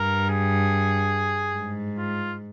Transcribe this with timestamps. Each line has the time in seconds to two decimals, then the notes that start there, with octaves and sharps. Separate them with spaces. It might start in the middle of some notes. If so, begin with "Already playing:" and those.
Already playing: G2 A#4
0.29 G#4
1.55 G#2
1.97 F4